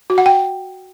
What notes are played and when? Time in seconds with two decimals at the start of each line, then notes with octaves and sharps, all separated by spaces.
0.10 F#4
0.18 F#5
0.26 G5